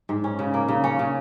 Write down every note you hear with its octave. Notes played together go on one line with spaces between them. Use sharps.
G#2
C#4
C#3
A#3
C#3
C#4
C#3